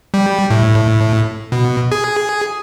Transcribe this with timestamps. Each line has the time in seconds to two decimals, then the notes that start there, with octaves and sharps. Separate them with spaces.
0.14 G3
0.50 A2
1.52 B2
1.92 G#4